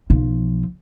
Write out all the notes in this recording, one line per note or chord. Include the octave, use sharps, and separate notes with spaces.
B1 F3